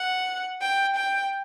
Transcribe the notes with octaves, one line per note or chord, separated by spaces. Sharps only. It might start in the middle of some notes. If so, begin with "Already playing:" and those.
Already playing: F#5
G5
G5